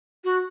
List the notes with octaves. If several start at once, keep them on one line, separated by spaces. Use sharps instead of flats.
F#4